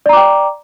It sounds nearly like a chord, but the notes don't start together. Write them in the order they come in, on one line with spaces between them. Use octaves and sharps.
D5 A#5 D6 G5